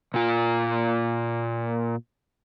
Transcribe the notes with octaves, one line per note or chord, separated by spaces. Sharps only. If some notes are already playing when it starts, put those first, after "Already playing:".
A#2 F4